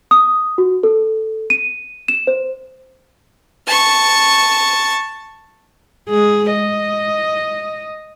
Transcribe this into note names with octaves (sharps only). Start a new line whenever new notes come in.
D#6
F#4
A4
D#7
E7
C5
A5 C#6
G#3 G#4
D#5